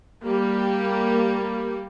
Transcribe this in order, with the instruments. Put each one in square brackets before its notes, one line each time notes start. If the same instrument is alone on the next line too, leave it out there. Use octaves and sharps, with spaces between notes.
[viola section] G3 A#3 G4